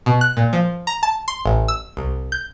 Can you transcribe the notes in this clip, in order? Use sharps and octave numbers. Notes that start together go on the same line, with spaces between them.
B2
F#6
A#2
F3
A#5
A5
C6
A1
E6
C2
G6